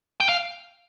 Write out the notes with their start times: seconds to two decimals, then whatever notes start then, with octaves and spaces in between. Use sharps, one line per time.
0.20 G5
0.29 F5